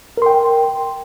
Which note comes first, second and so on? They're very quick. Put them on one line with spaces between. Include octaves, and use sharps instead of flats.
A#4 C6 G5